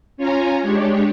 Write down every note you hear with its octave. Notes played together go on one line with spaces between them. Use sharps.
C#4 F4 C#5 G#5 A#5
G#3 D4 G4 C#5